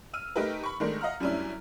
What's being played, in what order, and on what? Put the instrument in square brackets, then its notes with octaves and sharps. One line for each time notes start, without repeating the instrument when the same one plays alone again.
[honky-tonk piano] E6 F6 D#7
A3 D#4 G4 A#4 B4
B5 C#6
D#3 G#3 A3 D4 A#4
D#5 F5 F#5 A#5 F6
F#2 G3 A3 C#4 D4 E4